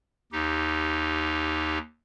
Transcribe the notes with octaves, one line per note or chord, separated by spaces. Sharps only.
D#2 D#4 G4